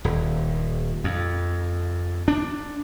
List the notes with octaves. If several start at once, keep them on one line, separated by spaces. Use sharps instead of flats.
D#1
F2
D4